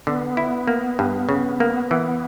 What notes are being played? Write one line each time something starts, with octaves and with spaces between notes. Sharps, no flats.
D3 B3
E4
A#3
G2
C#3
A#3
E3